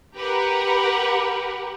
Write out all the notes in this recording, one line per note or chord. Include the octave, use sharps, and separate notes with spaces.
G4 A#4 B4 F#5